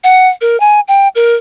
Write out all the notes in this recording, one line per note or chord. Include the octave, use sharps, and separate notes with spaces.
F#5
A#4
G#5
G5
A#4